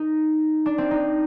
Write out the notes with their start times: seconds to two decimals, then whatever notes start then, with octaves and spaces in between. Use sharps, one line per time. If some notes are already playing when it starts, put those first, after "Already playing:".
Already playing: D#4
0.66 D4
0.78 C4
0.91 D#4